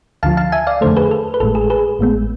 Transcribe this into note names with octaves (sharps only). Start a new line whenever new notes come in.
D2 D3 F3 F5 A5
F5 A5
E5 G#5
D5 F5
F2 D3 A3 A4 C5
G#4 B4
A4
B4
A1 A2 G#3 A4
G#4
G#4 B4
A1 A2 G#3 B3